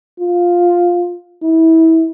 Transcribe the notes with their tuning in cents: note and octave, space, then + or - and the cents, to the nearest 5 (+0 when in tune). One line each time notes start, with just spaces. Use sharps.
F4 +5
E4 -25